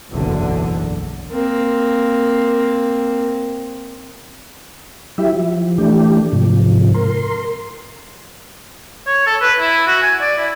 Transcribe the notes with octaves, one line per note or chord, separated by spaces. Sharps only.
F#1 B1 E2 D3
A#3 C4
F#3 E4 G4 E5
F3
E3 A3 D4 G4
G#2 C3 F3
A#4 C6
C#5
A4
B4
E4
F#4
G#5
D5
E4